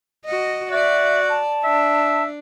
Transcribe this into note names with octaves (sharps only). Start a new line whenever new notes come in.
F#4 D#5
F#4 D5 E5
A5
D4 E5